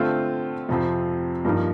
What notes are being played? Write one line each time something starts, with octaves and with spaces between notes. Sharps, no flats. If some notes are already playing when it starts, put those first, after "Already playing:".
Already playing: D3 A3 C4 F4
F2 C3 F3 C4
G2 F3 A#3 D#4